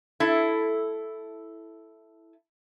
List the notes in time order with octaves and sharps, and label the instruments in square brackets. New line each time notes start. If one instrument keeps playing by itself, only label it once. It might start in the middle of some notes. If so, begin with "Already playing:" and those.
[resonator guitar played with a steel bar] E4 A4